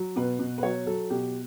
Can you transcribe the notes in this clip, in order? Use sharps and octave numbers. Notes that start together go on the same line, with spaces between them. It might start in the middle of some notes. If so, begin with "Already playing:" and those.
Already playing: F#3
B2 B4
B2
B4
F#3 C#5
F#3 A4
B2 G4